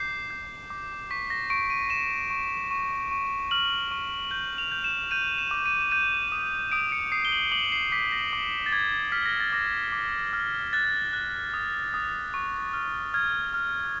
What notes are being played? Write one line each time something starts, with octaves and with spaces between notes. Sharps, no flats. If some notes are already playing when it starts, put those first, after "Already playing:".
Already playing: D6 G6 C7
G6
D6
C#6 B6
A#6
C#6 D7
D#7
C#6 E7
C#6
C#6
C#6
F6 F#7
C#6
G6 F#7
F7
G6
E7
G6 D#7
E7
D6
D#7
G6 D#7
D#6
D#6 D7
C#7
D#6 C7
G7
F#7
D6 F#7
C7
D6 B6
A#6
D6
A6
D6 G#6
A6
F6 B6
A#6
A6
D6 A#6
D6
F6
F#6 A6
F#6
D#6
D#6
C#6
F6
F6 G#6
F6